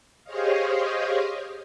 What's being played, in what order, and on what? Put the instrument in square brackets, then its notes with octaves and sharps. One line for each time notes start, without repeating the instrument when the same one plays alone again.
[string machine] G4 G#4 C5 C#5 D#5 F5